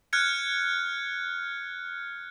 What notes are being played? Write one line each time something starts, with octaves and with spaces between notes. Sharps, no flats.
F6 F#6 G#6 C#7